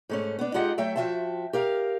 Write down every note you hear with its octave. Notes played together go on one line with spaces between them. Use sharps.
G#2 A3 C#4
B3 D4
G#3 D#4 F4 G4 D#5 F#5
F#3 A3 E5 G5
F3 F#4 E5 G5 A5
G4 A#4 F5